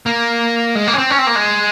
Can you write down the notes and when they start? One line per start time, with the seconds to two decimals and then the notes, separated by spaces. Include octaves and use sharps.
0.06 A#3
0.75 G#3
0.87 A#3
0.94 C#4
0.98 C4
1.10 C#4
1.19 C4
1.27 A#3
1.36 G#3